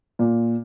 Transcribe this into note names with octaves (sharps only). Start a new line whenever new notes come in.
A#2